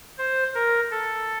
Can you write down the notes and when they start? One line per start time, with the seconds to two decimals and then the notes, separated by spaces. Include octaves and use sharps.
0.18 C5
0.54 A#4
0.91 A4